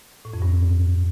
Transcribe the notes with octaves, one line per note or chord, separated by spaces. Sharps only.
A2
F2
G2